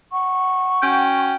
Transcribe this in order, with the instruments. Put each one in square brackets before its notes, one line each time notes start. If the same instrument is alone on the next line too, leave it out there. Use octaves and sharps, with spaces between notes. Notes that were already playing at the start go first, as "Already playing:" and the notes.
[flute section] F#5 C#6
[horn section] C#4 F#4 G5